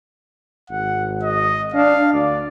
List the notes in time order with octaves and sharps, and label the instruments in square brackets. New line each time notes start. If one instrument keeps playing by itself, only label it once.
[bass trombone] G#1 [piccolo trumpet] F#5
[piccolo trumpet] D#5
[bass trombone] D4 [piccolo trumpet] F5
[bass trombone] D2 [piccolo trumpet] D5